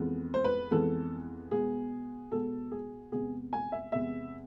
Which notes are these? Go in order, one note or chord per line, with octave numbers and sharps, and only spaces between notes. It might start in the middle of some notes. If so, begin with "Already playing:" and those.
Already playing: F2 E3 G#3 B3
C5
B4
F2 E3 G#3 B3 A4
B2 G#3 B3 G#4
B2 G#3 B3 A4
G#4
E2 C3 G#3 B3 G#4
G#5
E5
E2 C3 G#3 B3 E5